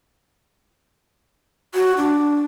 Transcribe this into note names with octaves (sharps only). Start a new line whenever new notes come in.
F#4
D4